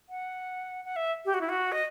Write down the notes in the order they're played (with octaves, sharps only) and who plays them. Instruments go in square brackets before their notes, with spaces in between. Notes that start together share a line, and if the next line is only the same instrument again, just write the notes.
[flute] F#5
F#5
E5
G4
F#4
E4
F#4
D#5